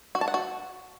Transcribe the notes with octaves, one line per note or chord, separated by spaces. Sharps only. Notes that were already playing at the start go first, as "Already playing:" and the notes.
F#4
A5
F#5
F#4